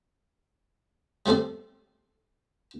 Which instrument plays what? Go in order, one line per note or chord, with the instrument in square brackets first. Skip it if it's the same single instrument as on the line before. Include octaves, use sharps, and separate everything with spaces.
[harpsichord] G3 A3 C4 A4 D5